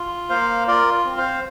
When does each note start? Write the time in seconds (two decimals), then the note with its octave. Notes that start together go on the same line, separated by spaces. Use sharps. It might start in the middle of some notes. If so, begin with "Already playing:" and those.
Already playing: F4
0.29 A#3 C5 F5
0.67 F4 A#4 D5
1.06 C4
1.17 C5 F5